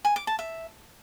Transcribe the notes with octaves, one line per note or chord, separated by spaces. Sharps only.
G#5
D6
A5
E5